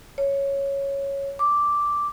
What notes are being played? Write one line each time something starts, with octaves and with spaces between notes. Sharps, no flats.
C#5
D6